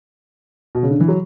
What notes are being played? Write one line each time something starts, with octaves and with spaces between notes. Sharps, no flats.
B2
C#3
D3
E3
F#3